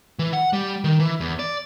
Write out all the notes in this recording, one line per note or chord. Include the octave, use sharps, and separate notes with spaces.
E3
F#5
G3
D#3
E3
E2
D5